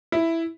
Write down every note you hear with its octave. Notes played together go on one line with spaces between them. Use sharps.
E4